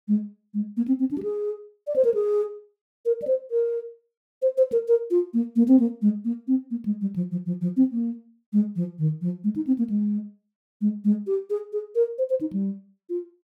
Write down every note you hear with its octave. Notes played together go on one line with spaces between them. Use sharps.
G#3
G#3
A#3
C4
C4
D4
G4
G#4
D5
C5
A#4
G#4
A#4
D5
C5
A#4
C5
C5
A#4
A#4
F4
A#3
A#3
C4
A#3
G#3
A#3
C4
A#3
G#3
G3
F3
F3
F3
F3
C4
A#3
G#3
F3
D#3
F3
G#3
D#4
C4
A#3
G#3
G#3
G#3
G4
G#4
G#4
A#4
C5
C5
D#4
G3
F4